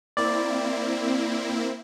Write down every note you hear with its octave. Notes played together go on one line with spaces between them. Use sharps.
A#3 C4 E4 D5